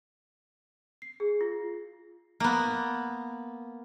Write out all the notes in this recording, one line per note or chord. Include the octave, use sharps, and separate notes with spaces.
C7
G#4
F4
A#3 B3